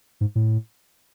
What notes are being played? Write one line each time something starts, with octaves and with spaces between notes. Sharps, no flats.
G#2
A2